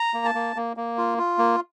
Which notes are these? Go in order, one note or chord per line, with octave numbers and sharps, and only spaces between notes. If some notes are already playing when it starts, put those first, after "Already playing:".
Already playing: A#5
A#3
A5
A#3
A#3
A#3
F4
F4
A#3